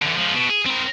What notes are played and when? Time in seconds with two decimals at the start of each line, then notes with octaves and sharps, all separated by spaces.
0.02 D3 E3
0.16 G#2 F3
0.34 B2
0.50 G#4
0.66 C4 A#4